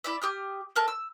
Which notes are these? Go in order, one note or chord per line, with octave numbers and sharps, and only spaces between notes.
E4 D5 E5
G4 D#6 F6
A4 A#4 A5
E6